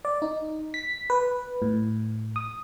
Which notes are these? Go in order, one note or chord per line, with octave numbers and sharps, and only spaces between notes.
D5
D#4
B6
B4
A2
D#6